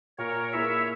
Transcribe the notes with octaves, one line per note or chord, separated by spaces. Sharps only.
A#2 A#4 C#5
A#3 E4 G#4 C#5 E5